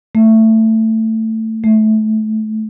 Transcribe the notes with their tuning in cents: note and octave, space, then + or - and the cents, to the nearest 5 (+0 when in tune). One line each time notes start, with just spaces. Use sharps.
A3 +15
A3 -20